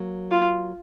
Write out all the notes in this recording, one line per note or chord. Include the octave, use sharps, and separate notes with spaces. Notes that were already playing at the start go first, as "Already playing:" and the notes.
Already playing: F#3 A#3
F4